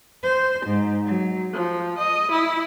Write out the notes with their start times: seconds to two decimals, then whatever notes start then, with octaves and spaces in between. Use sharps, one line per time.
0.21 C5
0.65 G#2
1.04 F#3
1.52 F3
1.97 D#5
2.30 E4